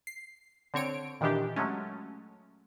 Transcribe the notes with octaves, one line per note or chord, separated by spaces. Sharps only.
C7
D3 C4 C#5 D7
A#2 D#3 E3 D4 G4
F#3 G#3 A3 C#4